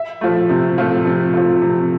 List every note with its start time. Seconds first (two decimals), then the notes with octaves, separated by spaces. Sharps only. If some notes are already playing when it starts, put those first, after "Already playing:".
Already playing: E5
0.21 F3 A3
0.49 C3
0.78 F3 A3
1.06 C3
1.34 F3 A3
1.62 C3